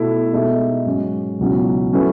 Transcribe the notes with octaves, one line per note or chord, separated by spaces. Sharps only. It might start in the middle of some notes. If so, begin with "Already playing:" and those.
Already playing: B2 A3 E4 A4
B2 G#3 D#4 A4 E5
G#2 F#3 C#4
C#2 B2 F#3 C#4 E4
F#3 A3 C#4 E4 B4